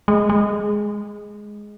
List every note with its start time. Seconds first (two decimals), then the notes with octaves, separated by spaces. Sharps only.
0.08 G#3
0.30 G#3